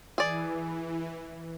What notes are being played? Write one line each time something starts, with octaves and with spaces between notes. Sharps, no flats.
E3 G#4 D5